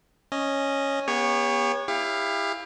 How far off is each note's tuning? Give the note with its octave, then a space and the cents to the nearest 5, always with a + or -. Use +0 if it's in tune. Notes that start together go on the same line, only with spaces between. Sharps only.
C#4 -5 D#5 +0
B3 -35 G4 +45 C#5 +0
E4 +0 G4 +35 F5 +0